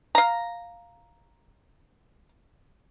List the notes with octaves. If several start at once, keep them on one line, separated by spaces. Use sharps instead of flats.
F5 A#5